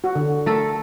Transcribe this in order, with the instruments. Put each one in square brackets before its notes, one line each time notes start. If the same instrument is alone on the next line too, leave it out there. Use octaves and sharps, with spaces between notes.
[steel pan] F#4
D3
[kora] A3 A4 A#4